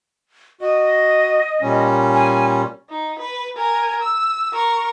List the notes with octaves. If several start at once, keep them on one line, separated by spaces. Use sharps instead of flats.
F#4 D#5
A#2 G3 C#4
G#5
D#4
B4
A#4 G#5
E6
A#4 C#6